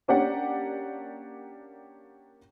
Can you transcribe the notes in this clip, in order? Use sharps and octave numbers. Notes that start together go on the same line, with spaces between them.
A#3 C#4 D4 G4 D5 F#5